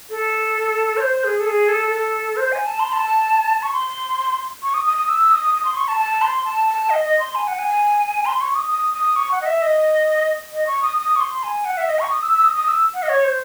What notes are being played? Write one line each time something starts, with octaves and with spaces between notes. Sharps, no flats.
A4
C#5
C5
G#4
A4
G#4
A4
A4
C5
G#5
A5
C6
A5
C#6
C6
C#6
D#6
D#6
D#6
E6
D#6
D#6
C6
C#6
A5
A5
C6
A5
A5
D#5
D#5
C6
G#5
F#5
G#5
C6
C#6
D#6
D#6
D#6
C#6
F#5
D#5
E5
D#5
D#5
C#6
D#6
D#6
C#6
C6
G#5
F#5
E5
D#5
C#6
D#6
E6
E6
D#6
D#6
E6
F#5
D#5
C#5
C5